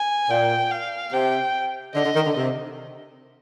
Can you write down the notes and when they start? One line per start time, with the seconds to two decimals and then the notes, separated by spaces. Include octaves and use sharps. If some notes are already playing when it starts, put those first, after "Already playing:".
Already playing: G#5
0.30 A#2 G5
0.71 F5
1.13 C3 G5
1.95 D3 D#5
2.05 D3
2.15 D#3
2.26 D3
2.36 C3